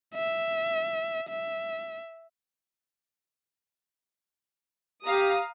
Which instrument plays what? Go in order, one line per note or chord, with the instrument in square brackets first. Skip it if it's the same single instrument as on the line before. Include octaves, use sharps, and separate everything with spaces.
[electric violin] E5
E5
[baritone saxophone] G4 [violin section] F5 A#5 D#6